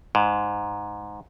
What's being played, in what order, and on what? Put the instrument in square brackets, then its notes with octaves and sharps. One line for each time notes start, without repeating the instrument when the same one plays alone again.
[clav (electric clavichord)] G#2